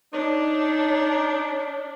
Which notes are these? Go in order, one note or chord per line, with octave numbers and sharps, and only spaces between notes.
D4 D#4 C#5